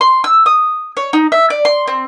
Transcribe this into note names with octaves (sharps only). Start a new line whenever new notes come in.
C6
E6
D#6
C#5
D#4
E5
D5
C6
C4